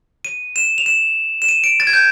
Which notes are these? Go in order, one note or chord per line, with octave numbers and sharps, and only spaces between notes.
D#7
E7
F7
E7
E7
D#7
D7
A6
G#6
G6